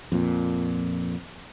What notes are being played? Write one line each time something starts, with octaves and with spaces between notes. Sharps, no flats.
F2 A#2